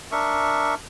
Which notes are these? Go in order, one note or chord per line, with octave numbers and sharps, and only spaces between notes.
D4 A#4 E5 C#6